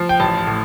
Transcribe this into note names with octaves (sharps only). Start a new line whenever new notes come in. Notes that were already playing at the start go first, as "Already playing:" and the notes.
Already playing: F3
G5
A1 A5
A5
A2